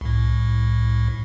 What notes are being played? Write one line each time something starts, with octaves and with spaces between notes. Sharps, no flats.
C2 A2